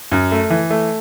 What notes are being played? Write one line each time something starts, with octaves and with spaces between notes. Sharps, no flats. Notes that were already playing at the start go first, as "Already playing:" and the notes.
F#2
A3
E3
A3